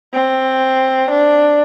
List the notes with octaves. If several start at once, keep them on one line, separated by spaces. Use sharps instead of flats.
C4
D4